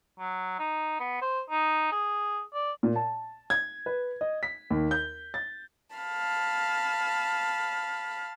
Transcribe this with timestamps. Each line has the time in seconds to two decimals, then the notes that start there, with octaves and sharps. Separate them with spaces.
0.19 F#3
0.59 D#4
1.00 B3
1.22 C5
1.50 D#4
1.92 G#4
2.54 D5
2.83 A#2
2.96 A5
3.50 G#6
3.86 B4
4.21 D#5
4.43 B6
4.70 D#2
4.91 G6
5.34 A6
5.96 F5 A5 B5